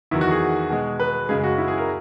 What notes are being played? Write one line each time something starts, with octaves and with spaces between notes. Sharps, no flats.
E2 D#3 F#3 E4
F#4
G#4
B2 G#3
B4
F#2 C#3 G#3 G#4
F#4
E4
G#4
A#4